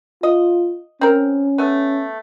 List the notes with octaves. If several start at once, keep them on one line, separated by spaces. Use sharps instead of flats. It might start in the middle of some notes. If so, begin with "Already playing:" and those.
F4 D#5
C4 C#4 A#4
A3 B3